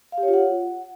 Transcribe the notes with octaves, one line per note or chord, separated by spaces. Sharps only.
F5
G4
C#5
F4
F#5